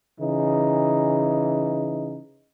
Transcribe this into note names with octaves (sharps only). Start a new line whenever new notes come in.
C#3 E3 D#4